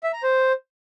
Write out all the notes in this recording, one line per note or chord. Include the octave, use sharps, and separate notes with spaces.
E5
A#5
C5